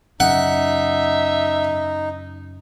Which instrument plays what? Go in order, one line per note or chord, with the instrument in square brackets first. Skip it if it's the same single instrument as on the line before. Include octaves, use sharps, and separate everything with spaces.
[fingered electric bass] F#2 C#3 [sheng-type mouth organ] D#4 [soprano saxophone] E5 [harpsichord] F#5